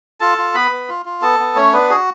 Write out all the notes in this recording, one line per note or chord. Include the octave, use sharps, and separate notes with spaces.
F4 A4 A5
F4
B3 B4 B5
B3
F4
F4
B3 A4 A5
B3
A3 C#4 C#5
B3 D4 B4
F#4 G#4